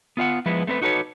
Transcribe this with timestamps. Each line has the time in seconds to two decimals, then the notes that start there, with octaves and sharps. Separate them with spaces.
0.17 B3 F4 F5 F#5
0.46 F3 G#3 B3 E4 B4
0.67 A3 C4 A#4 B4
0.81 D#4 F#4 A4 B4 C#5